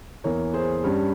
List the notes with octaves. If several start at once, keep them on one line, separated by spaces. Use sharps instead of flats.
E2 E3 A#3 A#4 C#5
G#4 C5
G2 G3 C#4